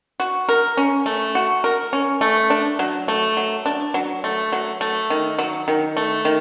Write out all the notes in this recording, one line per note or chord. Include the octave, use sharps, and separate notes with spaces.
F#4
A#4
C#4
A3
F#4
A#4
C#4
A3
D4
F#3
A3
F#3
D4
F#3
A3
F#3
A3
D#3
F#3
D#3
A3
D#3